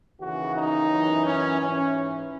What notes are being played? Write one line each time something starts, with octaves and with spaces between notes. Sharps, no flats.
D#2 C#3 E3 F#4
D#4
F#2 E3
C#4
G#2 E3 C#4